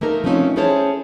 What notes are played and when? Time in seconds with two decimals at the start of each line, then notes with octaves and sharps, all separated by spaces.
0.01 A3 A#3 D#4 A#4
0.24 F3 A3 C4 C#4 D#4
0.56 C#4 E4 G#4 A4 C5 C#5